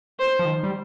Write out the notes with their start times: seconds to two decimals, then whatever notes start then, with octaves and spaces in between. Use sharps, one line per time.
0.19 C5
0.39 F3
0.45 D#3
0.63 G3